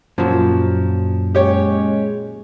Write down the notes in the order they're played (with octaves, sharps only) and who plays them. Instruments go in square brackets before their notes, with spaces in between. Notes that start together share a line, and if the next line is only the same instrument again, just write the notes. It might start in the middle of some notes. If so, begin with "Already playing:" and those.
[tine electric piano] F#2 [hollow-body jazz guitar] A#2 F#3 [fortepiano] F3
[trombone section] G#3 C#4 [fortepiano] G4 C#5